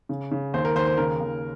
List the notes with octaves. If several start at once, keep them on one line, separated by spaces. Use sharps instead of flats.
C#3
C#3
D#2 C5
A#4
D#2 C5
C5
C#3 A#4
D#2